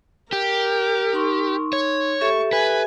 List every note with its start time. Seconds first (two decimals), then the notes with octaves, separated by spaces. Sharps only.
0.33 G4 A#4
1.13 D#4 C6 C#6
1.73 C#5
2.21 G4 A4 E5 C#6
2.53 B4 G#5